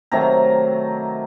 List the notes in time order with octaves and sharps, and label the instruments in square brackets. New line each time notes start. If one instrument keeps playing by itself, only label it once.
[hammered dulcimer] C3 D#3 F#3 A3 A#5